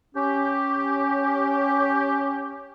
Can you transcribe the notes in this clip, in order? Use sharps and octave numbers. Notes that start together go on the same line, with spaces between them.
C#4 G4